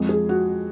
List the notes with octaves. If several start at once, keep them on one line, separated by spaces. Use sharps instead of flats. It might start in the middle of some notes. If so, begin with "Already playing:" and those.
Already playing: F2 F3 G#3
G#4
F#4